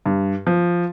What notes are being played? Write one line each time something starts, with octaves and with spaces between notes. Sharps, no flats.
G2
F3